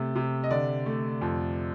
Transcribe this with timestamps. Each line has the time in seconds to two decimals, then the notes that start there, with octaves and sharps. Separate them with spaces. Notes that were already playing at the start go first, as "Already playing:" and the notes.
Already playing: C3 A3
0.15 C3
0.43 D#5
0.51 D3 D5
0.86 A3
1.21 F2